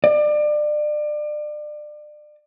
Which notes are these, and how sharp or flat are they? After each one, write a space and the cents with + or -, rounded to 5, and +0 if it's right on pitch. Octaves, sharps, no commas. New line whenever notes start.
D5 +30